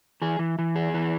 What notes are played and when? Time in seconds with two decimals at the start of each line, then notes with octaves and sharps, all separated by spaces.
0.22 E3 G#4
0.39 E3
0.59 E3
0.76 E2 G#4
0.94 E3